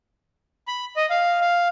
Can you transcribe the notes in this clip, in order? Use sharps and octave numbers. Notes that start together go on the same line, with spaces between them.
B5
D#5
F5
F5